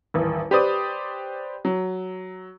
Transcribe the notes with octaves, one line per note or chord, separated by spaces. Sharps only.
D#1 A1
G4 B4 C5 D5 D#6
F#3